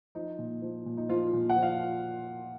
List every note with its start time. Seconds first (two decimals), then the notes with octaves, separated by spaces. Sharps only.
0.15 F3 D#4
0.39 A#2
0.62 F3
0.86 A#2
0.97 D#4
1.09 F3 F4
1.33 A#2
1.50 F#5
1.56 F3
1.62 F5